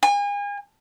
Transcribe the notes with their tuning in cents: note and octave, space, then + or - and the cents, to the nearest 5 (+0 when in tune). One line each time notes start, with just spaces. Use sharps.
G#5 -35